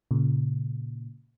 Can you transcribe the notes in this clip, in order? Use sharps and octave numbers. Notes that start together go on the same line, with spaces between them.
A#2 C#3